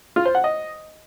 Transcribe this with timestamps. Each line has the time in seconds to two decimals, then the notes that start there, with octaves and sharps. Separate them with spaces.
0.16 F4
0.25 C5
0.35 F#5
0.44 D#5